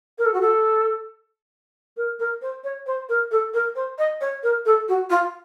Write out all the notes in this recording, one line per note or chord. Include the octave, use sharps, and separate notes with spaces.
A#4
A4
F#4
A4
A#4
A#4
C5
C#5
C5
A#4
A4
A#4
C5
D#5
C#5
A#4
A4
F#4
F4